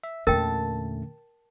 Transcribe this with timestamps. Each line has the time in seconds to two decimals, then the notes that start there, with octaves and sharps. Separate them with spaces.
0.04 E5
0.27 E2 A#2 D3 A3 C#4 A#4 G5 A5